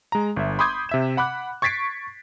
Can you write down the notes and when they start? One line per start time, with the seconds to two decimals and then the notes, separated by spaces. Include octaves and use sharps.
0.12 G#3 A#5
0.36 G1 E5
0.59 B5 C6 D6 D#6 G6 G#6
0.89 C3 E5 E7
1.17 F#5 B5 D6 F#6
1.62 C#6 G#6 A6 B6 C7 D7